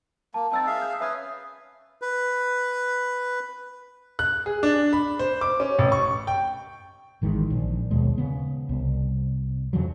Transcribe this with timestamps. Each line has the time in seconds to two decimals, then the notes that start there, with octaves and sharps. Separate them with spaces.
0.34 A#3 A5
0.52 C4 D#4 A5 E6 A6
0.67 G#4 E5 F5
0.82 G6
1.01 C#4 B4 E5 D#6 G#6
2.02 B4
4.19 F#6
4.46 G#4
4.63 D4
4.93 B5
5.19 C5
5.41 D6
5.60 C#4
5.79 A1
5.92 C#6
6.27 G5
7.22 G#1 D#3 E3 G#3
7.50 A#1
7.91 D#2 B2 G#3
8.18 C#3 B3
8.69 C2
9.73 F2 C#3 F3 F#3